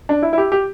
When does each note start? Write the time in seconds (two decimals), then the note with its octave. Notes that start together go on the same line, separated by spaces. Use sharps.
0.09 D4
0.22 E4
0.33 E4
0.38 G4
0.52 G4